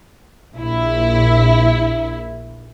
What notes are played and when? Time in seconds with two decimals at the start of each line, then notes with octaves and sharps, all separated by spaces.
0.57 A#1 E4